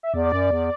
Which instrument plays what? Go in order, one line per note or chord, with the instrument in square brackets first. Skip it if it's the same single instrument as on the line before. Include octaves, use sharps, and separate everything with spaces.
[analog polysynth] E5
[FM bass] E2 [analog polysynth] D5
[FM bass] F#2
E2